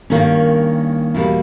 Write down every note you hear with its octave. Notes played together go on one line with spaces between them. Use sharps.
G2 D#3 A#3 C#4
E2 B2 G3 A#3